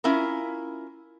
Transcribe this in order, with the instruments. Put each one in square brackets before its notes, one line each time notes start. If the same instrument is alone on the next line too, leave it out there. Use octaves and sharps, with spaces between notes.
[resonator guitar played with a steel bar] C#4 E4 F4 A#4